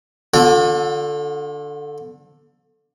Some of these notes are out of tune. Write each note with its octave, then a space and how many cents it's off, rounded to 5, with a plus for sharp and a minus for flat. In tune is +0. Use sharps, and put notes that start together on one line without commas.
D3 +0 F4 +45